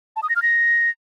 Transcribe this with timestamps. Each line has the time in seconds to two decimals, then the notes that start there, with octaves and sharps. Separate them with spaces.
0.16 A5
0.23 D#6
0.29 A#6
0.36 F6
0.42 A#6